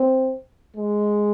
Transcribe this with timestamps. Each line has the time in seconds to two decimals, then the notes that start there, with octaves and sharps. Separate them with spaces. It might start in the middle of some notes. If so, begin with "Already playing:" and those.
Already playing: C4
0.76 G#3